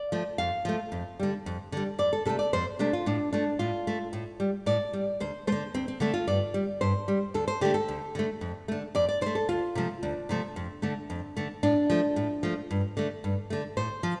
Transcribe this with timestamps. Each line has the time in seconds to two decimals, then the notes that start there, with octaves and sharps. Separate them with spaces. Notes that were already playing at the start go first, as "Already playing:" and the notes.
Already playing: D5
0.12 F3 A3
0.38 F2 F5
0.65 F3 A3
0.92 F2
1.19 D3 G3
1.46 F2
1.72 D3 G3
1.99 F2 D5
2.13 A4
2.25 C3 A3 A4
2.39 D5
2.53 F2 C5
2.79 C3 A3 D4
2.93 F4
3.06 A2 D4
3.33 A3 D4
3.59 A2 F4
3.87 A3
4.13 A2
4.40 G3
4.66 A2 D5
4.93 G3
5.20 D2 C5
5.47 D3 A3 C5
5.74 D2 C4
5.88 C4
6.00 D3 A3 D4
6.14 F4
6.28 G2 D5
6.54 G3
6.81 G2 C5
7.08 G3
7.34 D2 A4
7.48 C5
7.61 D3 A3 G4
7.74 A4
7.88 D2
8.15 D3 A3
8.41 F2
8.68 D3 A3
8.95 F2 D5
9.09 D5
9.21 D3 A3 C5
9.35 A4
9.49 D2 F4
9.75 C3 F3 A3
10.03 D2 D4
10.29 C3 F3 A3
10.56 F2
10.82 D3 A3
11.10 F2
11.37 D3 A3
11.63 A2 D4
11.90 F3 A3
12.16 A2
12.43 F3 A3
12.71 G2
12.97 D3 A3
13.24 G2
13.50 D3 A3
13.77 A2 C5
14.03 F3